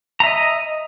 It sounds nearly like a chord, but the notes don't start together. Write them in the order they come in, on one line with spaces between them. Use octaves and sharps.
A#5 E5 D#5